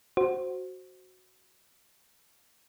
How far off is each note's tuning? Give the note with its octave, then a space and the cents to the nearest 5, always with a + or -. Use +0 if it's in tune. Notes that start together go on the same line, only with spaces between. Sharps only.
F#4 +0 C5 +5